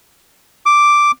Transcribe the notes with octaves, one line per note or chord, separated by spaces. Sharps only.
D6